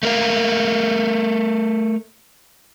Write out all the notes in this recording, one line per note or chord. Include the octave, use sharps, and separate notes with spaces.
A3 A#4 F5